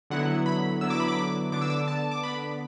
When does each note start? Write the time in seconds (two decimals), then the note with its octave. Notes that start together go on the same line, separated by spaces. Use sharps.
0.10 D3 F#3 B3 E4 F#5
0.46 B5
0.81 D3 F#3 B3 E4 E6
0.90 D6
1.00 B5
1.08 D6
1.52 D3 B3 D4 D6
1.61 E6
1.70 D6
1.88 A5
2.11 D6
2.23 D3 B3 D4 B5